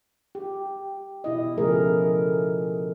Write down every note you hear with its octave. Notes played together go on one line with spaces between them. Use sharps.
G4
B2 E4 D#5
C#3 F3 A3 G#4 A#4